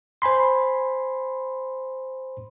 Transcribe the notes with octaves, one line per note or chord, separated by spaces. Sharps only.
C5 G#5 B5 C6